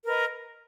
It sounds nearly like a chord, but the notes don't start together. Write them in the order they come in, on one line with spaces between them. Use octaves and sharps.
A#4 B4 D#5